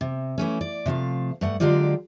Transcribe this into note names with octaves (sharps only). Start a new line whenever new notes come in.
C3
E3 A3 C#4
D5
C3 F3 A3 F5
G2 A3 F#5
D3 F#3 G#3 F4 G4 D5